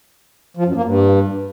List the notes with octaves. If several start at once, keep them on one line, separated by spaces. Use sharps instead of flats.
F3
F#2
A#3
G2